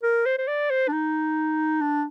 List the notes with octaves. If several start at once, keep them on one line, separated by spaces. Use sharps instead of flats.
A#4
C5
C5
D5
C5
D4
D#4
D4